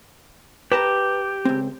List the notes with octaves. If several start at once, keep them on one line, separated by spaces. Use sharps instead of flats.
G4 B4 A5 A#5
C#2 C4